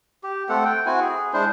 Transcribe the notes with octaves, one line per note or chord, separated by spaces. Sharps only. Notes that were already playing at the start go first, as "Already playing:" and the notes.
G4
A3 C4 A4 F#5
G5
C4 E4 F#4 G#5
G#4
G#3 D4 E4 C5